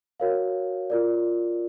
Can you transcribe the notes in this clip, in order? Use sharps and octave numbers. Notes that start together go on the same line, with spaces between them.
F#4 A#4 C#5 F5
F4 A#4 D5